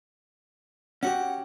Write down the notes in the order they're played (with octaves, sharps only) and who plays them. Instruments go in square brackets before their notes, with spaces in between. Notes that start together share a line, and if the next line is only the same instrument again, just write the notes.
[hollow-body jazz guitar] C#4 F#4 G4 [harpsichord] F#5